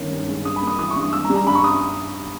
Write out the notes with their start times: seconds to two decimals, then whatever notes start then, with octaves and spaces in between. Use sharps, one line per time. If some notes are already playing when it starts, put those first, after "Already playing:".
Already playing: G1 D#3 C#4
0.11 G2
0.28 G#3
0.45 G2 D#6
0.56 B5
0.62 A#3
0.67 D#6
0.79 E3 D#6
0.91 C#6
0.96 G2
1.02 D#6
1.13 G#1 E6
1.24 A#5
1.30 G3
1.35 A#5
1.47 G2 B5
1.55 C#6
1.64 D#6